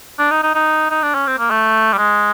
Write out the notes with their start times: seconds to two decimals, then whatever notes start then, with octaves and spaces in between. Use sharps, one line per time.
0.19 D4
0.31 D#4
0.43 D#4
0.55 D#4
0.91 D#4
1.03 D4
1.14 C#4
1.27 C4
1.38 A#3
1.50 A3
1.93 G3
1.98 G#3